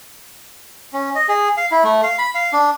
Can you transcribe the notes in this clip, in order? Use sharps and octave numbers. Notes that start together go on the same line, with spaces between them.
C#4
D#5
G#4
F5
E4
A3
F5
B5
F5
D4